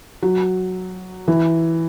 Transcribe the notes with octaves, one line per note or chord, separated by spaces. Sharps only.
F#3
E3